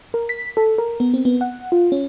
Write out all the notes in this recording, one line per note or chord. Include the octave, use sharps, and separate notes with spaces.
A#4
B6
A4
A#4
B3
C4
B3
F#5
F4
C#4